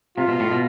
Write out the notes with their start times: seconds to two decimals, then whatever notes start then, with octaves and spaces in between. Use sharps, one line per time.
0.18 C3 F4
0.28 B2
0.40 A2
0.51 B2